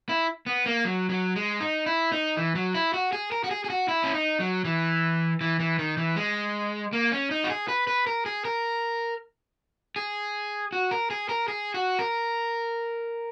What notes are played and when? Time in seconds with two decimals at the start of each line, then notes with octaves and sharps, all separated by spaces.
0.09 E4
0.46 B3
0.66 A#3
0.85 F#3
1.10 F#3
1.36 G#3
1.60 D#4
1.86 E4
2.12 D#4
2.37 E3
2.55 F#3
2.75 E4
2.94 F#4
3.13 G#4
3.32 A#4
3.44 F#4
3.51 G#4
3.64 G#4
3.70 F#4
3.88 E4
4.04 C#4
4.14 D#4
4.40 F#3
4.65 E3
5.41 E3
5.60 E3
5.79 D#3
5.97 E3
6.16 G#3
6.93 A#3
7.12 C#4
7.31 D#4
7.44 F#4
7.50 G#4
7.68 B4
7.87 B4
8.07 A#4
8.26 G#4
8.45 A#4
9.96 G#4
10.72 F#4
10.91 A#4
11.10 G#4
11.29 A#4
11.48 G#4
11.74 F#4
11.99 A#4